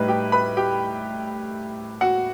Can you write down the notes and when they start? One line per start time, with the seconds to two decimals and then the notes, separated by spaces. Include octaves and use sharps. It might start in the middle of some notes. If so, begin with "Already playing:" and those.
Already playing: A2 G3 D#4 B4
0.08 G4 G5
0.32 B4 B5
0.57 G4 G5
2.01 F#4 F#5